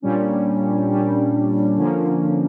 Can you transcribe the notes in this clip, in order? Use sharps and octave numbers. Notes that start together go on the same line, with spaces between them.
A#2 G3 C#4 D4
A#2 G3 C#4
D3 F3 A#3 C#4